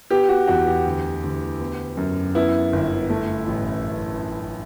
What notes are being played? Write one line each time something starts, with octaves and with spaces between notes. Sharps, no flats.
B3 G4
F#4
E2 F#4
G4
D2
D2
B3
F#2
B3 E4
G1
A3
A1